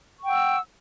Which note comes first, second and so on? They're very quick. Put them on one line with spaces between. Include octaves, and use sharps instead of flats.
C#6 G5 F#5 E6